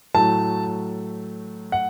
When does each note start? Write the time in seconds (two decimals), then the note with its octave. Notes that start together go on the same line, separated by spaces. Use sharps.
0.15 A2 F#3 A3 A5
1.72 F#5